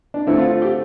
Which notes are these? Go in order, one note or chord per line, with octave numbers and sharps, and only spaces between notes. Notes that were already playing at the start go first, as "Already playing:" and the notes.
D4
D3 A3 C4 E4
F4
F4
G4